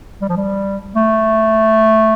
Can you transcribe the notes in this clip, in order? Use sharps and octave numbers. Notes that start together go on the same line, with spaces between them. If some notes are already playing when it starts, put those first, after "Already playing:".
G3
F3
G3
A3